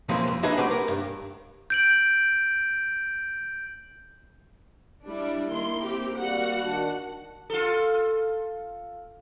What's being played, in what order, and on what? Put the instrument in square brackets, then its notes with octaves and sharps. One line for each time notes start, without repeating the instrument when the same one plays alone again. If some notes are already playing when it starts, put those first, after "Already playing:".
[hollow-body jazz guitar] C#3 E3 F3 G#3 A#3 C4
F2
D4 D#4 G#4 B4 D#5 E5
G3 A3 C4 F#4 B4 D5
A#4
G2
[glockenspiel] G6 D7 F#7
[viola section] G3 D4 [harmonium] E4
[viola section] D#3 A#3 C6
A#3 C4 G4
[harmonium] G3 A#3 [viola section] F#4 F#5
[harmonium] D#3 D4
[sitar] F4 A4